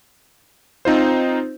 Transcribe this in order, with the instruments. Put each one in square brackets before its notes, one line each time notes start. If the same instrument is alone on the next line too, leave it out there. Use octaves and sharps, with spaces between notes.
[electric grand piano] C4 D#4 F4 C5